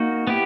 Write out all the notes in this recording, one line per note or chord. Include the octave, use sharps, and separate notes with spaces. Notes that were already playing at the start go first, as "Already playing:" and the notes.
Already playing: A#3 D#4 F#4
B3 E4 G4